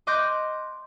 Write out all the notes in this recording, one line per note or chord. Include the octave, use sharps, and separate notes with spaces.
D#5 C6 D6 F#6 G6 A#6